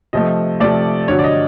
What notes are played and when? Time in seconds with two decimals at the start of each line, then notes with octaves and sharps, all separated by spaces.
0.13 C3 F3 A3 D#5
0.60 C3 F3 A3 D5
1.08 G2 D3 F#3 C#5
1.19 D5
1.24 D#5